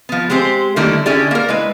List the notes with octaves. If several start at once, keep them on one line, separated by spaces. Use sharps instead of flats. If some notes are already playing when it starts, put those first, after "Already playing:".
F3 B3
G#3 C4 G4 C5
D3 D#3 G3 A3 A#3 E4
D3 C#4 E4 G4 G#4 D5
A#3 A#4
G#3 E4 B4